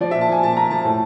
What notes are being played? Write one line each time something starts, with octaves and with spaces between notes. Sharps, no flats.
F3 D5
A#2 E5
A5
F3 G#5
A#2 A5
A#2 A#5
F3 A5
A2